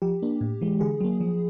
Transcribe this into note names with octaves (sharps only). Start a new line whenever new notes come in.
F3 G4
A#3 D4
A2
E3 G#3
D3 G#4
F#3 A#3
F3